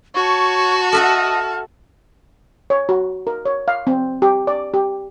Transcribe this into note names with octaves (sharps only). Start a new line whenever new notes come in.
F#4 C#5 A5 C#6
A4 D#5 E5 F#5 F6
C#5
F#4
A#4
C#5
F5
C4
G4
D5
G4